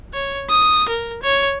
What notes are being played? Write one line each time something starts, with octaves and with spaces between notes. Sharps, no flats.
C#5
D#6
A#4
C#5